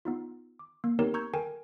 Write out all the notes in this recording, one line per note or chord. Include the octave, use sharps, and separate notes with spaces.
B3 D#4 F4
D6
A#3
B3 C4 D#4 G4 A#4 C#5
A#5 C#6 E6 G6 G#6
A4 A#4 G5 G#5